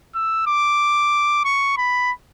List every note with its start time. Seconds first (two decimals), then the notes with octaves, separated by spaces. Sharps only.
0.15 E6
0.47 D6
1.45 C#6
1.77 B5